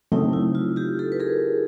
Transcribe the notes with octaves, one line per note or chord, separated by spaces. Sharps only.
C#3 F#3 A3 C4 D#4
E4
F4
F4 G4
G4 A4
B4
G#4 A#4